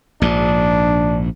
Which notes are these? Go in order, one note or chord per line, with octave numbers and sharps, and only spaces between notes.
A#1 G#2 D4